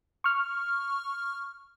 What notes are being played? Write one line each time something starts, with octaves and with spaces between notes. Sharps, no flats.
C#6 F6